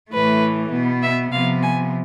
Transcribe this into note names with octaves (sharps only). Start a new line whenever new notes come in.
A2 E3 A3 B4
B2 B3
E5
C3 F3 B3 F5
G#5